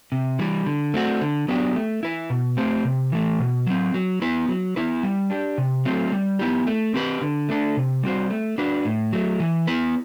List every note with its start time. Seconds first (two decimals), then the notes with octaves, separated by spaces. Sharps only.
0.12 C3
0.39 E3 G3
0.66 D3
0.94 A3 C4 F#4
1.21 D3
1.48 F#3 B3 D4 G4
1.75 A3
2.03 E4 B4
2.30 B2
2.57 A3 C4 G4 C5
2.85 C3
3.12 E3 A3
3.39 B2
3.67 F#3 C4
3.94 F#3
4.22 B3 E4 B4
4.48 F#3
4.76 B3 E4 B4
5.03 G3
5.30 D4 G4
5.58 C3
5.85 F#3 A3 C4
6.12 G3
6.39 B3 E4 G4
6.67 A3
6.94 C4 G4 B4
7.21 D3
7.49 A3 D4 A4
7.77 C3
8.03 G3 C4 F#4 C5
8.30 A3
8.58 D4 F#4 B4
8.85 A2
9.13 F#3 A3
9.40 E3
9.67 B3 E4 B4